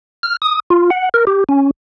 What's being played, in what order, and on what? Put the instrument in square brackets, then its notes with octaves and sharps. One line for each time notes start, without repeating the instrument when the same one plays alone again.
[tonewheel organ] F6
D#6
F4
F#5
A#4
G4
C#4